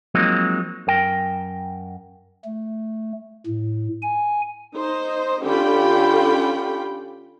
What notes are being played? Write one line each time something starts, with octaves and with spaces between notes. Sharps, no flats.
F3 F#3 G#3 A#3 C4 D#4
F#2 A#4 G5
A3
A2
G#5
D#4 C5 D#5
D3 C#4 F4 G4 G5 B5